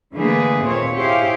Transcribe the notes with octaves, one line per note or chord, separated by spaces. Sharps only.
D3 E3 A3 A#3 G#4 B4
D#2 A#2 C4 C#5
E4 G4 G#4 C5 C#5 F5